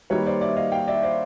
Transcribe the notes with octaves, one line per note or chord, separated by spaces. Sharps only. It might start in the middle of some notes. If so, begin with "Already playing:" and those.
D#3 G3 A#3 B4 C#5
C5 D5
D5 E5
D#5 F5
F5 G5
D5 E5
C5 D5